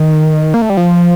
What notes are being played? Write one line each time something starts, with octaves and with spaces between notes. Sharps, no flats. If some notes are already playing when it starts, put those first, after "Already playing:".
Already playing: D#3
A#3
A3
G3
F3